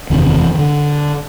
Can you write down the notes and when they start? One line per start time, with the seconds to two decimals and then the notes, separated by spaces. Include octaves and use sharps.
0.10 F#1 E2 C3 D#3
0.34 E3
0.54 D#3
0.59 D3